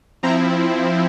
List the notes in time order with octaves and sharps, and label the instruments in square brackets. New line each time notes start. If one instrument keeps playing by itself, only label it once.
[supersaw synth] F3 C4 E4 A#5